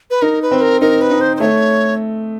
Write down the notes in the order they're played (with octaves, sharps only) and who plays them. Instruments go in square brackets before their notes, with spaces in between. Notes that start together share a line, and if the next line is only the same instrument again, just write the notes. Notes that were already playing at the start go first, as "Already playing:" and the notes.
[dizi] B4
[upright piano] D#4 [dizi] A#4
[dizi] B4
[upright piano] C4
[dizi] A#4
[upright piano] D#4 [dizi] A#4
[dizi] B4
[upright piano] D#4
[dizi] C5
C5
[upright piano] A3 [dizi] C#5